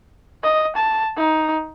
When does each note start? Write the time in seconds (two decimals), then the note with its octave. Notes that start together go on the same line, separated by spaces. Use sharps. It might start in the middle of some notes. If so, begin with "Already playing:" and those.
0.43 D#5
0.76 A5
1.17 D#4